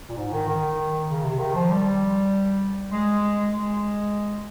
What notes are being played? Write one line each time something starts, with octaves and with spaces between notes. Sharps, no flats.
A#2
G#2
D#3
D#3
C#3
C3
D#3
F3
G3
G#3
G#3